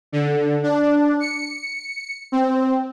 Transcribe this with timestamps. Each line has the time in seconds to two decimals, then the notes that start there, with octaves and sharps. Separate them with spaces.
0.12 D3
0.63 D4
1.20 C#7
2.32 C4